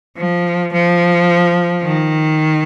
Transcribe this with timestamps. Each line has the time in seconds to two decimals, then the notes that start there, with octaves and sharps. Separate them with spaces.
0.17 F3
0.73 F3
1.85 D#3